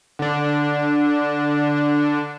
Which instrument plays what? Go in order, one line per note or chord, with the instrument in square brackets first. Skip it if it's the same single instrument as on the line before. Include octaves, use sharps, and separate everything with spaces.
[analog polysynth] D3 D4